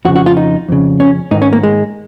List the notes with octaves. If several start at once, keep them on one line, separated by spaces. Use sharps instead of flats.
F2 C#3 F#4
F#4
F4
D#4
F2 C#3
C#4
G#2 D#3 D#4
C#4
A#3
G#3